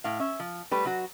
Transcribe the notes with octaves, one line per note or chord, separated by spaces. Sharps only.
A2 F5
C#4 E5
F3
G3 A3 B4
F#3 F#4